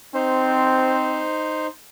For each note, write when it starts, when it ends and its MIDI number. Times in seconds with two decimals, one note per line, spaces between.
0.14 1.27 60
0.14 1.67 63
0.14 1.67 72